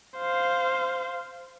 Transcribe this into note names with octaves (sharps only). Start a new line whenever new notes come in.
C5 F5